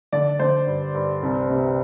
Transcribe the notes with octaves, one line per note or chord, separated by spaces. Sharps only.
D3 D5
D3 C5
G2
G2
C2
C3